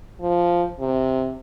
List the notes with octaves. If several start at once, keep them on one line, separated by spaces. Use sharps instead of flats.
F3
C3